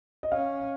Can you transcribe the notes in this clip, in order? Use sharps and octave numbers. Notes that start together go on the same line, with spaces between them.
D#5
C#4 F5